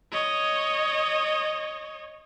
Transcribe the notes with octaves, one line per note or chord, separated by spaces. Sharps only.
C#5 D#5